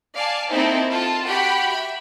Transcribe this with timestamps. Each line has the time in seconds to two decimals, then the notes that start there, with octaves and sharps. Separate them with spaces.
0.17 D5 F5 G#5 A5
0.51 A#3 C4 D#4 E4 A4 C5
0.89 F4 A4 A5
1.27 F#4 G4 F#5 G5 B5
1.67 E5 B5